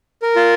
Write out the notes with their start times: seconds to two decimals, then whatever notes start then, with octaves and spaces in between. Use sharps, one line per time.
0.22 A#4
0.36 F4